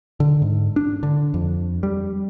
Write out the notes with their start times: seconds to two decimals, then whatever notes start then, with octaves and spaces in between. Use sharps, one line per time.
0.20 D3
0.42 G#2
0.76 D4
1.03 D3
1.34 F2
1.83 G3